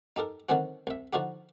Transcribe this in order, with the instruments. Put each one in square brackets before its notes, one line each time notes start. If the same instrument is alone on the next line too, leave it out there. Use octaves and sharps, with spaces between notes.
[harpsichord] D#4 G4 A4 A#4
D3 D#3 F#3 C4 C#4 F#4
C2 E5
D3 F3 D#4 F#4 G4